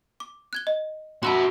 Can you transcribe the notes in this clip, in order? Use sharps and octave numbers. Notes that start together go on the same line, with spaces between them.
D6
F#6 G#6 G7
D#5
F#4 E5 A5 B5 C6